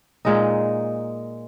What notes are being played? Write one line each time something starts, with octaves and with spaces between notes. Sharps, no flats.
A#2 G#3 D#4